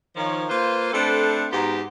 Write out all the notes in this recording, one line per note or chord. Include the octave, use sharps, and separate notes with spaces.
D#3 F3 C#5
A#3 F4 B4 C5
A3 C4 D4 A4 B4 C5
G#2 B3 F#4 G4 C5 A#5